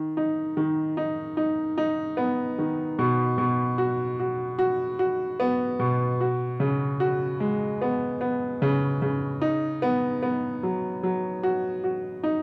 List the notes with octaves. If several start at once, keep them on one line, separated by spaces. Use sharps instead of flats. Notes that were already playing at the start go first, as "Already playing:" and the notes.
Already playing: D#3
D#4
D#3
D#4
D#4
D#4
B3
D#3
B2
B2
F#4
F#4
F#4
F#4
B3
B2
F#4
C#3
F#4
G#3
B3
B3
C#3
C#3
D#4
B3
B3
F#3
F#3
F#4
F#4
D#4